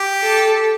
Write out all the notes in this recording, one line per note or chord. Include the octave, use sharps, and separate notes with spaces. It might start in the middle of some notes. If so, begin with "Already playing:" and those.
Already playing: G4
A4